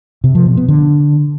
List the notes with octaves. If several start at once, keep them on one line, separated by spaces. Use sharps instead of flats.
C3
F3
B2
B3
D3